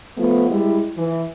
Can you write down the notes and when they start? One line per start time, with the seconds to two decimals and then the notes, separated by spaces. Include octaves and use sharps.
0.17 F3 A3 B3
0.48 G3 G#3 E4
0.97 E3